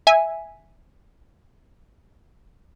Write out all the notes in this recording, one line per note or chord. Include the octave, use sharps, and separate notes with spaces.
E5 G#5